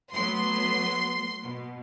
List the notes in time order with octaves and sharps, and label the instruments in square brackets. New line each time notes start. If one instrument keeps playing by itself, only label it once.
[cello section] F#3 A3 B3 [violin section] C6
[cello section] B2